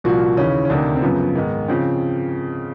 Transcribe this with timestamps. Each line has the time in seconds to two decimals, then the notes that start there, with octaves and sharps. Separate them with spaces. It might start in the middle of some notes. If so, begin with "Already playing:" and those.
0.04 C2 A#2 F3 F#4
0.37 D#2 C#3 E3 C#4
0.65 C#4
0.70 D2 C3 D#3 D4
0.95 C4
1.02 F#2 C#3 F3 B3
1.35 G#2 D#3
1.68 C#3 F3 C4